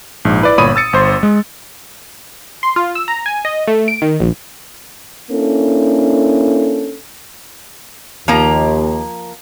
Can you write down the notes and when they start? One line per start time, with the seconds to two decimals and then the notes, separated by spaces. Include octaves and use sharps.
0.25 A#1 G#2
0.41 E4 B4 D5
0.58 G1 A#2 C#5 B5 D#6 D#7
0.76 E6 A6 C#7
0.93 G1 C5 C6
1.23 G#3
2.63 C6
2.76 F4
2.95 E6
3.08 A#5
3.26 G#5
3.45 D#5
3.68 A3
3.88 D7
4.02 D#3
4.20 A#1
5.31 A#3 C#4 D4 E4 A4
8.28 D#2 F3 A#3 A#5